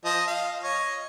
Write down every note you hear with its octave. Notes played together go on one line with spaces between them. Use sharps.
F3 D#5 D#6
F5
C#5 D#5